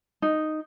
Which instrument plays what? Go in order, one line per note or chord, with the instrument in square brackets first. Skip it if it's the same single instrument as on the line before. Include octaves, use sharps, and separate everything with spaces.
[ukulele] D#4